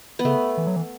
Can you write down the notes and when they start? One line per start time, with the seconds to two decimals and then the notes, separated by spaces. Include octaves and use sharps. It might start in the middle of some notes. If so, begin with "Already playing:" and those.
0.19 B3
0.25 C#3 A3
0.58 E3
0.67 F#3
0.76 E3